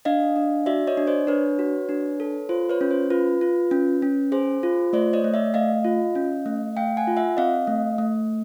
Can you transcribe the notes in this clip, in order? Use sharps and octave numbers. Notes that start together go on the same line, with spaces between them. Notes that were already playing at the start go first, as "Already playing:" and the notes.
D4 D#5 F5
D4
F#4 D5 E5
C#5 D#5
D4
C5 D5
D4 B4 C#5
F#4
D4
A4
F4 C5
B4 C#5
C#4
C5
F4 B4
F4
C#4
C#4
G#4 C5
F4
A3 C5 D5
C#5 D#5
A3
D5 E5
A3 D#5 F5
F4
C#4
A3
A3 F5 G5
F#5 G#5
F4
E5 F#5
C4 D#5 F5
A3
A3